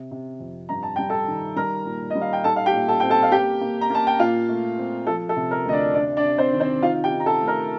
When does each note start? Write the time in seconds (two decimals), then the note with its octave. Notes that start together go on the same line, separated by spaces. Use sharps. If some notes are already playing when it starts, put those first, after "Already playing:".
Already playing: C3
0.11 C3
0.40 F2
0.69 G2 A#5
0.83 A5
0.96 G3 G5
1.10 A4 A5
1.28 D#3
1.56 G3 A#4 A#5
1.86 A#2
2.10 G3 D#5
2.22 F5
2.33 G5
2.44 D#4 A4 A5
2.56 F5
2.66 G4 G5
2.73 A#2
2.88 A4 A5
3.00 C4 G5
3.10 A4 A5
3.23 F5
3.32 A#3 G4 G5
3.61 A#3
3.81 A#5
3.90 A#3 A5
4.07 G5
4.19 A#2 F4 F5
4.49 A3
4.79 C4
5.07 F3 A4
5.29 A4
5.36 C3
5.51 A#4
5.66 D2 D#5
5.73 D4 D5
5.94 C3 D4 D5
6.17 D4 D5
6.24 C3
6.38 C4 C5
6.53 D#3
6.60 C4 C5
6.82 D#4 F4 F5
7.04 G4 G5
7.11 D#4
7.20 A#5
7.26 A4 A5
7.40 A3
7.48 A#4 A#5